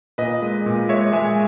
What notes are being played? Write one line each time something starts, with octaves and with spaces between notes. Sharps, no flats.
A#2 B4 D#5
G#3
A#2
G#3 C#5 E5
G#3 E5 G#5